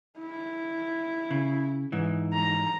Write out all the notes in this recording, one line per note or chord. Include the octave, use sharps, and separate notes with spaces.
E4
C#3
G#2 E3
A#5